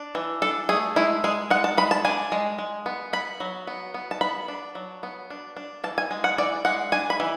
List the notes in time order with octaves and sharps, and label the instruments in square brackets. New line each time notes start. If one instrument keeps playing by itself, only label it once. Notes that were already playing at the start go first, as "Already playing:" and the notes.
Already playing: [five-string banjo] D4
E3
D4 A4
A3 G#4
G#3 E4
G#3 G#4
G#3 F#5
A5
G#3 B5
A5
D4 G#5
G#3
G#3
B3
B3 B5
F#3
B3
B3
A5
B3 B5
D4
F#3
B3
D4
D4
E3 A5
G#5
G#3
F#5
E3 D5
G#3 F#5
D4 G#5
B5
E3